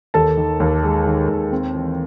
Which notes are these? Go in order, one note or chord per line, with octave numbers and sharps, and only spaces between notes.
D#2 A4 A5
D#3
D#2
G#3
D#3
D#2
C4
E3